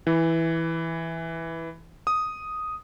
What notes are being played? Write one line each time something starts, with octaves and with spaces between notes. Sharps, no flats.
E3
D#6